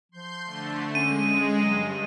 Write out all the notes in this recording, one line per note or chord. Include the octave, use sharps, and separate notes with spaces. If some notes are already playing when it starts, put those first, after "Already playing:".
F3 C6 G6
D3 A3
G#3 C#4 D#7
G2 F#3